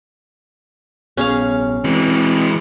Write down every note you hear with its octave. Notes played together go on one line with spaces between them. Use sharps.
A#1 B3 C#4 G#4 F5
E3 G#3 C4